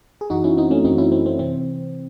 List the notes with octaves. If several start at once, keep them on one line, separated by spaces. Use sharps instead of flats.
G#4
F#2 E3 D#4 F#4
C#4 E4
C4 D#4
A3 C#4
F#2 E3 C4 D#4
C#4 E4
C4
C4
C3 E3 C4